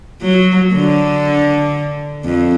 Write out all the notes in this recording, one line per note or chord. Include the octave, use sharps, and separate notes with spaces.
F#3
D3
F2